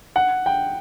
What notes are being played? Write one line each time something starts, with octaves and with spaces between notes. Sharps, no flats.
F#5
G5